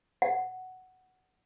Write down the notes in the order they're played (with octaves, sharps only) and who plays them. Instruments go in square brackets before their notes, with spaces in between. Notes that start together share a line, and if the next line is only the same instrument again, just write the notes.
[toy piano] F#5